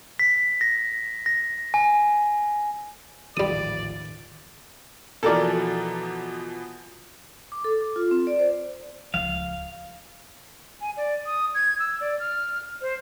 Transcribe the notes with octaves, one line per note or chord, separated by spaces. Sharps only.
B6
A#6
A#6
G#5
D#1 A1 D#3 F3 G3 D5 D#6
B2 E3 F3 A4 A#4 D5
D6
A4
D6
F4
C4
D5
C5
D1 C#2 F3 F5
G#5
D5
D#6
G#6
E6
D5
F6
C5